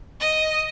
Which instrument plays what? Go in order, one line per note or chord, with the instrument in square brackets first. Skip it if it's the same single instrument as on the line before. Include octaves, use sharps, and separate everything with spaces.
[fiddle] D#5